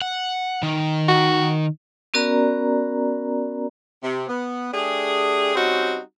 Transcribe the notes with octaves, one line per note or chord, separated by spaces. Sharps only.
F#5
D#3
F#4
B3 C#4 F#4 A#4 D5 A#5
C3
B3
A3 D4 G4 G#4
G3 C4 C#4 D#4 F#4